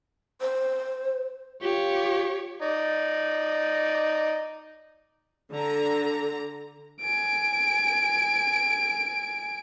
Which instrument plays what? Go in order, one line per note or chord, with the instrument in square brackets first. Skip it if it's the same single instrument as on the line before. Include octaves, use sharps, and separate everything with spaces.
[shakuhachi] C5
[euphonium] F4 [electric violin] G4 C#5
[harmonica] D#4 D5
[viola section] D3 A#5
[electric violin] G#5 D7